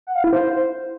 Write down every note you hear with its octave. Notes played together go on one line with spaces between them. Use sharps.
F#5
F5
E4
C5